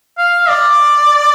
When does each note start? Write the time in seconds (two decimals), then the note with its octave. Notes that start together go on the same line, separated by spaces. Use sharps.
0.18 F5
0.49 D5